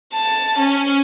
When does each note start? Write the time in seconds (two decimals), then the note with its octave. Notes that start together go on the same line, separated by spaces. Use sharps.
0.13 A5
0.59 C#4